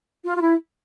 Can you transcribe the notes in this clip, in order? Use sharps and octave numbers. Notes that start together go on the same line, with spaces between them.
F4
F4
E4